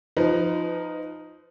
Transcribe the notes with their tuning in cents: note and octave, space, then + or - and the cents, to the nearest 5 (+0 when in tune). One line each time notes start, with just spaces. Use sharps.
F3 +0 D#4 +0 B4 +30